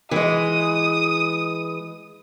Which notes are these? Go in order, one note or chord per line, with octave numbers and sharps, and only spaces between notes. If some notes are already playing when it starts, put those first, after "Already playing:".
E3 G#3 D#6